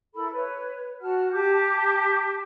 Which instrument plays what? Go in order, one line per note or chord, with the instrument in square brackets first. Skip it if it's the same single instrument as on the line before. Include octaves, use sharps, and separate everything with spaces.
[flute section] E4 A4 A#4 B5
B4 C#5
F#4 F#5 A5 F6
G4 A5 D6 G6